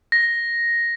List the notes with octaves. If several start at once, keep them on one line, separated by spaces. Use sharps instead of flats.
A#6